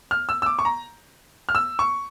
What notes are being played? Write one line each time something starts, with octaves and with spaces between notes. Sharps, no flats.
F6
E6
E6
D6
C#6
A#5
F6
E6
C#6